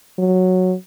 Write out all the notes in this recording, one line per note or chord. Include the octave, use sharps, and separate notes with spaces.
F#3